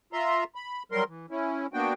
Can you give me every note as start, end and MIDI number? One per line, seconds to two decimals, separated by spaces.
0.13 0.44 65
0.13 0.44 76
0.13 0.44 82
0.13 0.44 84
0.55 0.83 83
0.92 1.04 54
0.92 1.04 55
0.92 1.04 70
0.92 1.04 84
1.08 1.26 52
1.30 1.67 61
1.30 1.67 64
1.73 1.93 58
1.73 1.93 59
1.73 1.93 62
1.73 1.93 66
1.73 1.93 79